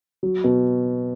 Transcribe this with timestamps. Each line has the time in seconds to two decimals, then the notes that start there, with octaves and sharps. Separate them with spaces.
0.23 F#3
0.44 B2